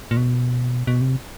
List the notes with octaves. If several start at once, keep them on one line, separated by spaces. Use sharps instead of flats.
A#2
B2
B2
C3